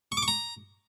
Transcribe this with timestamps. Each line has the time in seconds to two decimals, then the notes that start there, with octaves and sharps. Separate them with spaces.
0.12 C#6
0.17 D6
0.22 C#6
0.28 A#5